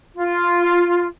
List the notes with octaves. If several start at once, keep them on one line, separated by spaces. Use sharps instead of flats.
F4